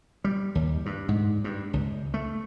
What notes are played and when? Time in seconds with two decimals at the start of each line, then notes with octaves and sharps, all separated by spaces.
0.24 G3
0.55 D#2
0.86 G2
1.09 G#2
1.44 G2
1.73 C#2
2.14 A3